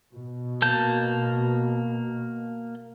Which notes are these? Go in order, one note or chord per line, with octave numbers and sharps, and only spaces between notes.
B2
A#3 A5 G6